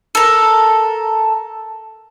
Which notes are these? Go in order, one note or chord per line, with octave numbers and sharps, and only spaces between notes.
A4 A#4